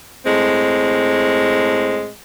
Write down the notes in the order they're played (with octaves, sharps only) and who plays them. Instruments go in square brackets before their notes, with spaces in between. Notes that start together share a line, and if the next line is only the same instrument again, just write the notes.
[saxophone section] A2 G#3 C4